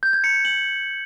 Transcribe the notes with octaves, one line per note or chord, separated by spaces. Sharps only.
G6
G#6
C#7
G6
F#7